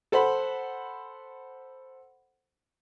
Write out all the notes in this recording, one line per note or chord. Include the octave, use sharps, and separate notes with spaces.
A4 C5 F#5 B5